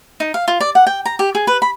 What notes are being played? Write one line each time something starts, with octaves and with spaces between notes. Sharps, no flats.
D#4
F5
F4
D5
F#5
G5
A#5
G4
G#4
B4
B5